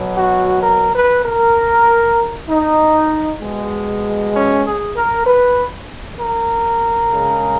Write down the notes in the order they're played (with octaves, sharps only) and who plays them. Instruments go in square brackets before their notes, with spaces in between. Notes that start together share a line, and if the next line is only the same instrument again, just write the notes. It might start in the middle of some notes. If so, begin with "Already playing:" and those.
Already playing: [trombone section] B2 F#3
F#4
A#4
B4
A#4
D#4
B2 G#3
C#4
G#4
A#4
B4
A#4
C#3 G#3